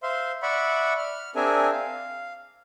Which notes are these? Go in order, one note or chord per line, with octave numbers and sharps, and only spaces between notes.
C5 E5 F5 C6
D5 E5 F#5 B5 C#6
F6
C4 D4 G#4 A#4 E5 G#5
F5